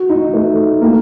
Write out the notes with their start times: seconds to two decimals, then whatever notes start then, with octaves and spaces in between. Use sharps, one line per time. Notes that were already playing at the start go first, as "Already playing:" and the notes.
Already playing: F#4
0.09 D#4
0.34 A3
0.82 A#3